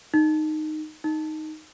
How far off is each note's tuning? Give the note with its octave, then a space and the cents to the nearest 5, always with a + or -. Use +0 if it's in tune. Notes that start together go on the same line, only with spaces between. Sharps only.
D#4 -10
D#4 +0